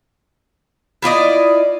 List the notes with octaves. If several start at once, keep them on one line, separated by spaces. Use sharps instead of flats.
E4 F4 D5 D#5